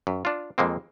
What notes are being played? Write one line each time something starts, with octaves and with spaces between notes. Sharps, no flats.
F#2
D4 F4
F2 G#3 A#3 C4